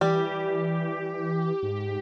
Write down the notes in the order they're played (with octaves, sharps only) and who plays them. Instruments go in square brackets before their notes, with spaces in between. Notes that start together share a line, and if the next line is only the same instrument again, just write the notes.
[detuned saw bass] E3 [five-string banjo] G3 [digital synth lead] G4
[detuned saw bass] G#2